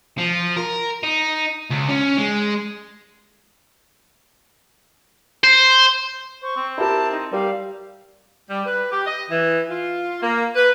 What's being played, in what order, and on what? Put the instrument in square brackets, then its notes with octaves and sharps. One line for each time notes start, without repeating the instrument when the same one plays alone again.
[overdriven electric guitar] F3
A#4
D#4
C#2
C#4
G#3
[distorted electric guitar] C5
[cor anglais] C5 [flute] C#6
[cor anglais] C4
[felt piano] E4 G4 A#4 [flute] A5
[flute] D#4
[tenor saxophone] G3 [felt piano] A#4 [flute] F5
[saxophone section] G3
B4
G4
D#5
E3
F4
A#3
B4